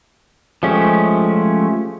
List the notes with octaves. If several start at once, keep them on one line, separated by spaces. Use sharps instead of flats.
F3 G#3 A3 C#4 G4